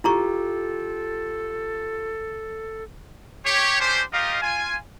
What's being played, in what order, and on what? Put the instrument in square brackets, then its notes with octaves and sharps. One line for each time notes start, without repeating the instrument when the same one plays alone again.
[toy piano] E4 A#5 C#6 [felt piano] F4 G4 [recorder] A4
[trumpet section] G4 C#5
C#4 D4 G4 C5
D#4 F4 G4 A#4 D#5 F5
F4 G#5